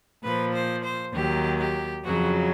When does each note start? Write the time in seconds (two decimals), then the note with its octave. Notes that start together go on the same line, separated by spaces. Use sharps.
0.24 A#2 F3 B4
0.54 C5
0.84 C5
1.14 D#2 D#3 F#3 G4
1.58 G4
2.03 F2 C#3 F#3 F#4